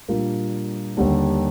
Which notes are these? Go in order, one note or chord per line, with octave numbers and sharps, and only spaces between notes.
A#2 G3 A#3 D4 F4
D#2 D3 G3 D4